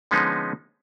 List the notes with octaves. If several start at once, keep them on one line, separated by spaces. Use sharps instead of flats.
D3 F3 G#3 B3 C#4 D#4